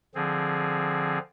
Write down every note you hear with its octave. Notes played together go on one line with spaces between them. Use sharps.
D3 F3 C4 G#4